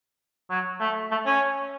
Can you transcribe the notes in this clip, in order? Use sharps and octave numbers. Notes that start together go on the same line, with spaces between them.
F#3
A3
A3
C#4